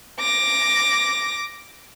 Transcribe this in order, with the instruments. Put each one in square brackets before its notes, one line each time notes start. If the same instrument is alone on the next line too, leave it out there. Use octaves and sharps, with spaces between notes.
[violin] D6 A#6